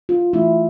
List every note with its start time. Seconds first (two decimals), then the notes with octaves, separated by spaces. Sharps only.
0.09 F4
0.33 E3 A3 E4